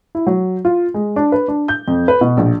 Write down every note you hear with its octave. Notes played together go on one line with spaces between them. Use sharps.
E4
F#3
F4
G#3
D4
B4
D4
G6
F2
B4
B2
A#1